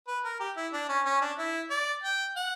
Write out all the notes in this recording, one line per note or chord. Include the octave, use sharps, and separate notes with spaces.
B4
A#4
G4
E4
D4
C#4
C#4
D4
E4
D5
G5
F#5